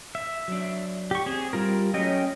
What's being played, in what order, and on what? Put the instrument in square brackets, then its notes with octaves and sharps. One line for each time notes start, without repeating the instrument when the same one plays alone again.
[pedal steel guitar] E5
[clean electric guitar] F#3 D4
[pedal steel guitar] G4 C#6
[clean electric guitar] C4 [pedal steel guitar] G#4
[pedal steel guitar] G3 F4 A#4
[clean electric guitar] F#3 A3 [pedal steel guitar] C#4 D#5 G5